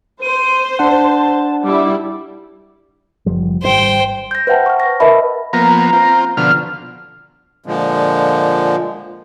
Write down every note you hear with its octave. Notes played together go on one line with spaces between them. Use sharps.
C5 D#7
D4 F#5 A5
G3 E4 D6
F#1 F3 G3
G#1 D#3 G3 C5 G5
G6 A#6
B4 C5 E5 F#5 G5 A5
C#6 F6
A#6
A#4 B4 D#5 E5 A5 B5
F3 A#3 B3 A#5
C4 F4
B2 D3 F3 F6
A#2 D3 F3 G#3